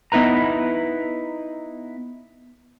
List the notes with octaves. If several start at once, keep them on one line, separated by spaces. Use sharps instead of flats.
B3 D#4 E4 B4 A#5